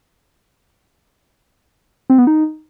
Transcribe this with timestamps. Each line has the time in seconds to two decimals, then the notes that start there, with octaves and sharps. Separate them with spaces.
2.10 C4
2.18 B3
2.27 D#4